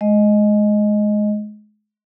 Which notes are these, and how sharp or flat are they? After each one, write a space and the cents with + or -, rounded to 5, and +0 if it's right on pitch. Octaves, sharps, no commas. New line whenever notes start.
G#3 +25 D#5 +0